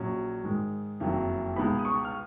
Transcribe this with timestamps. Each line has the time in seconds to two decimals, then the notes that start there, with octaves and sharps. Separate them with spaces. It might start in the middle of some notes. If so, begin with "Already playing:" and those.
Already playing: A#1 A#2 F#3 C#4
0.44 G#2 D#3 G#3
1.00 F#1 F2 D#3 F#3
1.56 C#2 B2 G#3 B3 D#4 B5
1.79 D#6
1.85 C#6
2.05 F6